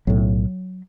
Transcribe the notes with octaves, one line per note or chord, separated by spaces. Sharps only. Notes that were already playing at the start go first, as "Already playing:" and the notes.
B1 A2 F#3